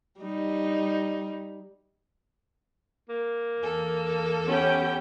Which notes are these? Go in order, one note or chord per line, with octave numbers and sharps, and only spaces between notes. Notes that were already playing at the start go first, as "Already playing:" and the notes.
G3 D#4
A#3
E2 A4
B3 C#4 G4 G5